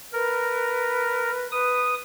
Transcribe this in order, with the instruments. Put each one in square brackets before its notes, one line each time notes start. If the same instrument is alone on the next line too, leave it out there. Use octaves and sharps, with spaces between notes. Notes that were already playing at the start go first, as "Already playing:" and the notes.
[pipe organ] A#4 [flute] B4
[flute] B4 [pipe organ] D#6